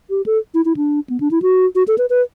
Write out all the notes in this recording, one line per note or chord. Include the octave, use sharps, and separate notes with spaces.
G4
A4
E4
E4
D4
B3
D4
E4
F#4
F#4
A4
B4
B4